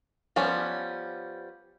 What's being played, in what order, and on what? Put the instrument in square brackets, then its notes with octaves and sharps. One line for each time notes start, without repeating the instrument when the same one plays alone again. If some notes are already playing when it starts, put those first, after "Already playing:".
[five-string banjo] F3 G3 B3 C#4